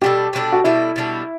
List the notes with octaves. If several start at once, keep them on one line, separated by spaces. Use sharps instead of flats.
B2 G3 D4 G4 A4
B2 G3 D4 A4
F#4
B2 G3 D4 E4 A4
B2 G3 D4 A4